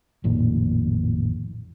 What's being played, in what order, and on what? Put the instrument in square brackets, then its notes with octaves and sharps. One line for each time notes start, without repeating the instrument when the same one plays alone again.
[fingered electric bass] A1 F2 A#2 D#3